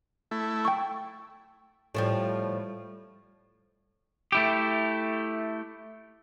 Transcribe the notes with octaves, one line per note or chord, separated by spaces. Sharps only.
A3 E4
G5 C#6
A2 F3 G3
A3 E4 G4